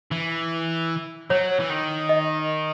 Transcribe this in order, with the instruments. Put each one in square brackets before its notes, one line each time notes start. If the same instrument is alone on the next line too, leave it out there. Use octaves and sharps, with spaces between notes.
[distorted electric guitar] E3
[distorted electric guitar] F#3 [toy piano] C#5
[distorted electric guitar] E3
D#3
[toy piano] D#5